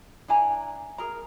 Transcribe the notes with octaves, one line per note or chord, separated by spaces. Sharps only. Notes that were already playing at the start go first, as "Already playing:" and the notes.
D4 E4 G#5 A#5
G#4 A#4 A#5